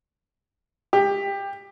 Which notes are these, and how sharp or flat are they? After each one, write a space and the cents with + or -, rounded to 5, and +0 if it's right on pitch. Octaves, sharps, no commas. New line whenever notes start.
G4 +20